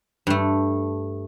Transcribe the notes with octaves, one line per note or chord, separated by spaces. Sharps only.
G2 A3